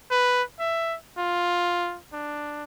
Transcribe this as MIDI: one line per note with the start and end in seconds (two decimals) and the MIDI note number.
0.11 0.43 71
0.59 0.96 76
1.18 1.98 65
2.13 2.64 62